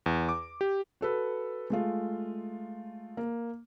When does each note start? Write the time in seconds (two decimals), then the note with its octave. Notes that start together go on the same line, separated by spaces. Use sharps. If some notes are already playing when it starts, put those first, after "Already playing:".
0.06 E2
0.29 D6
0.61 G4
1.01 F#4 A4 B4
1.70 G#3 A3 F4
3.17 A#3